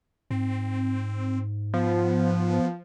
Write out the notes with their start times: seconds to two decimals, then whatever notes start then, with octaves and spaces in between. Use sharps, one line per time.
0.31 G#2 C4
1.74 F3 B3